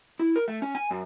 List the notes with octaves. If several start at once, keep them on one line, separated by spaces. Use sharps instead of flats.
E4
A#4
A3
C#4
G#5
F#2